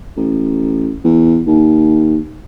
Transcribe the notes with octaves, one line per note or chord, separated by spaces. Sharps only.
A1
E2
D#2